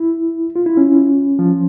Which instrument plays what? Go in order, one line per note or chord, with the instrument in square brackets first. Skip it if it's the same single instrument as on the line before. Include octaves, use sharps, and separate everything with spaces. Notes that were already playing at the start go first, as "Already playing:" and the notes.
Already playing: [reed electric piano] E4
F4
E4
C#4
F3